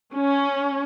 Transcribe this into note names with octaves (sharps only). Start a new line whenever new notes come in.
C#4